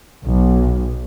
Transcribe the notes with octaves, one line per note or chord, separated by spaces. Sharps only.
B1